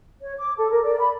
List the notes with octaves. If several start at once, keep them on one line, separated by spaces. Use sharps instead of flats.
C#5
D6
A4
A#4
D5
B5